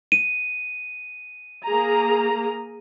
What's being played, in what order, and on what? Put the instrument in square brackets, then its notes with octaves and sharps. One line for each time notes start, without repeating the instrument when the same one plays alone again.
[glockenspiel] D#7
[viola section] A#3 G#4 A#5